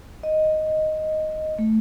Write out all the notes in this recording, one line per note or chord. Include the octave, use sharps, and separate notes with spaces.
D#5
A3